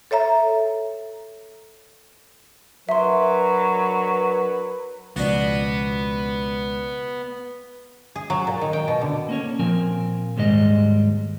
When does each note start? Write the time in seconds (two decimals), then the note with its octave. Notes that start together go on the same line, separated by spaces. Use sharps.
0.11 A4 C#5 E5 A#5
2.89 F#3 D4 A#4 B4 E5 C6
5.16 C#2 B2 F3 B3 D4 F#4
8.16 G#4
8.30 F#3
8.47 A#2
8.61 D#3
8.73 G5
8.88 B2
9.01 D3
9.29 A#3 C#4 C#5
9.59 A#2 F3 C4 A#4 G#5
10.37 D#2 G#2 G3 G#3 D#5